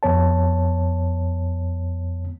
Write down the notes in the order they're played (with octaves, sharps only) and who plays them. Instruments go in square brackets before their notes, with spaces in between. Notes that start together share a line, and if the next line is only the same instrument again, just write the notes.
[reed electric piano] F2 B3 C#5 A5